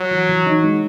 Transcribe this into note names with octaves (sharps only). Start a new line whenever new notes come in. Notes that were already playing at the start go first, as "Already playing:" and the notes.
Already playing: F#3
E3
E3
D#4
G#3